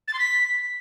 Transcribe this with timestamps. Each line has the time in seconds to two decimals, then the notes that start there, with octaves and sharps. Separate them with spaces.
0.08 A6
0.13 C6
0.19 B6